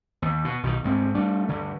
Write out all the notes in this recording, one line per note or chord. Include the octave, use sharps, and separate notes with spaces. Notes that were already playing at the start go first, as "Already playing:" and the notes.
D#2
B2
B1 B2 D3 D#3
D2 G#2 C4
G3 A3 D4
D2 G2 D3